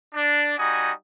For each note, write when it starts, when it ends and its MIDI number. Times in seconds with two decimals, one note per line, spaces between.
0.15 0.59 62
0.59 0.92 55
0.59 0.92 63
0.59 0.92 66
0.59 0.92 80
0.59 0.92 87